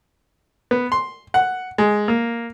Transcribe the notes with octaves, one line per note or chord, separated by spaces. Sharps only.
B3
C6
F#5
G#3
A#3